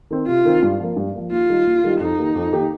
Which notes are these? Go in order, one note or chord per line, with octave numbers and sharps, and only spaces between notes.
D#3 C4
C3 F4
D#3 C4
G2
F3 A#3
G2
F3 A#3
D#2 F4
D#3 G3 D#4 G4
D#2
D#3 G3 D#4 G4
F2 D#4
D#3 A#3 G4
F2
D#3 A#3 G4